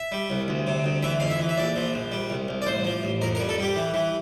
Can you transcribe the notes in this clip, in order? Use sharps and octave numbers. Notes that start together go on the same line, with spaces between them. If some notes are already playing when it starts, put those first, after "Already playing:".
Already playing: E5
G3
C2
D2
C3
D2
E3 E5
F2 F5
E5
E3
E5
A#1 D5
F3
A#1
G3
C2
C2
D5
A1 C5
F3
A1
F2 A#4
A#4
G3
A4
G3 G4
E3
E3